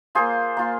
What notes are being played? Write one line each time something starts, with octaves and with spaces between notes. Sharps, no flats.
A#3 F4 G#4 C5
A#3 F4